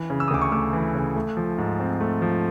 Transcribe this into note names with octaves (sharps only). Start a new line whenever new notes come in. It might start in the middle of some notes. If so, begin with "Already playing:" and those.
Already playing: E3
C#3
E6
D#6
D2 D6
C#6 D#6
A3 D6 E6
E3
C#3
A3
F3
G#2
C4
A3
F3